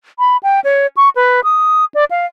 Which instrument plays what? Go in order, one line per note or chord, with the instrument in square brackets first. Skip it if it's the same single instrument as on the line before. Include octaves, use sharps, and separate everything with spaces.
[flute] B5
G5
C#5
C#6
B4
D#6
D5
F5